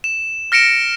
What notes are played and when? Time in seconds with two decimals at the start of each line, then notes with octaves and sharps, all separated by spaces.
0.04 E7
0.52 F6 A#6 C#7 D7 E7